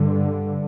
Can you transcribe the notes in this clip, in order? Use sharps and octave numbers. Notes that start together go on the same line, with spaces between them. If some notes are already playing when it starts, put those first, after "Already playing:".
Already playing: G2 D3